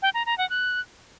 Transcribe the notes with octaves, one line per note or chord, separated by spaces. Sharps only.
G5
A#5
A#5
F#5
F#6